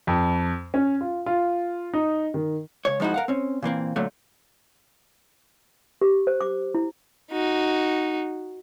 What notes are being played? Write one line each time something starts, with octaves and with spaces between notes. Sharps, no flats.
F2
C#4
F4
F4
D#4
D#3
C#2 C#5
F3 G#3 D#4 E4 F#4
A#4 F5 F#5
C4 C#4
A#2 E3 A#3 C4
A#2 D3 F#3 A3
G4
C5
D6
E4
D#4 F#4